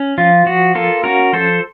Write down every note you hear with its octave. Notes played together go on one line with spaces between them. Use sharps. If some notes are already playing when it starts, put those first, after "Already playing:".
Already playing: C#4
F3 F4
F3 F#4
A#3 F4 A4
C#4 F#4 A#4
F3 A4 C5